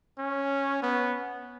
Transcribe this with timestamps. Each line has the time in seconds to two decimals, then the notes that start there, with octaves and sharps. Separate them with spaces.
0.19 C#4
0.82 B3